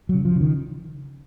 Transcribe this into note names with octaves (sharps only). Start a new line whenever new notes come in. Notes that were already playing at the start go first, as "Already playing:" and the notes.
F#3
C#3
F3
C#3
D#3